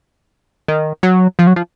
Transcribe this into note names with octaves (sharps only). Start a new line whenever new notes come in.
D#3
F#3
F3
F#3
F3